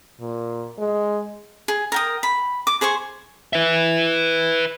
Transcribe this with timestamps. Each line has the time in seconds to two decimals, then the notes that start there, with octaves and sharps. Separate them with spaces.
0.20 A#2
0.78 G#3
1.68 G#4
1.92 A#4 G5 D#6
2.23 B5
2.67 D6
2.81 G#4 C5 G#5 C#6
3.53 B4 E5